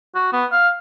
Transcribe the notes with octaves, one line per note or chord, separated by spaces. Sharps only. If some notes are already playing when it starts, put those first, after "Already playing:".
F#4
B3
F5